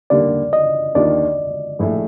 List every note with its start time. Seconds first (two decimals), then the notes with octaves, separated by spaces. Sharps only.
0.10 D#2 D3 G3 A#3 D5
0.53 D#5
0.95 D#2 D#3 A#3 D4 F4 D5
1.79 A#1 A2 A3